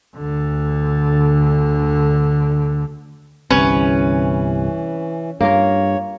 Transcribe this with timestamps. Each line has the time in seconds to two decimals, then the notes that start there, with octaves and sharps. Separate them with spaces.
0.17 D2 D3
3.50 G1 C2 C3 E3 C#4 B4
5.41 G2 A#3 F4 A#4 C#5